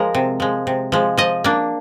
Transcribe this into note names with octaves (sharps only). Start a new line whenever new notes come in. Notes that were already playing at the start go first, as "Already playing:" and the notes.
Already playing: F3 G#3 A#4
C3
F3 G#3
C3
F3 G#3
F3 D#5
A#3 D4